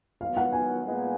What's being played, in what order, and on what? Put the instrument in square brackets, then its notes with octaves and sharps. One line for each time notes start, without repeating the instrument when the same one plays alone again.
[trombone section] D#3 F#3 B3 D#4 [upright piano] F5
[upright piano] F#5
G#5
[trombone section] A#2 G#3 B3 D#4